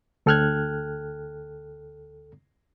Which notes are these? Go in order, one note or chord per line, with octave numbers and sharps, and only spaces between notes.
D2 A4 G5 F6 F#6 G#6